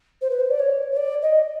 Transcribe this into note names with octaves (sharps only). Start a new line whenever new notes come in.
C5
B4
C5
D5
C#5
C#5
D5
D#5